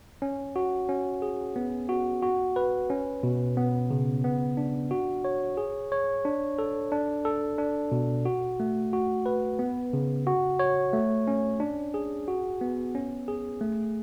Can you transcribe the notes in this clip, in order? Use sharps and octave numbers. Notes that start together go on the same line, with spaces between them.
C#4
F#4
C#4
G#4
B3
F#4
F#4
B4
C#4
B2
B3
C#3
B3
D4
F#4
C#5
G#4
C#5
D4
A4
D4
A4
D4
B2
F#4
A3
F#4
B4
B3
C#3
F#4
C#5
A3
C#4
D4
G#4
F#4
B3
C#4
G#4
A3